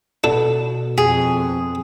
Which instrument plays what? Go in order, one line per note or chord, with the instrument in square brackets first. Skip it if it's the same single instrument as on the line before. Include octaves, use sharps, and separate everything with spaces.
[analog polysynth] B2 [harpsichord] D4 A4
[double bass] F2 [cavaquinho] G#4